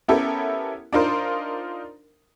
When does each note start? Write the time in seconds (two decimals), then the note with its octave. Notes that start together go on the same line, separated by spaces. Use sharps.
0.08 B3 C#4 E4 G4 A4 A#4
0.93 D4 D#4 F4 A#4 C5